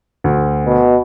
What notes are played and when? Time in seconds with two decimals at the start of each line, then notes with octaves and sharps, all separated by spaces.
0.24 D2
0.66 B2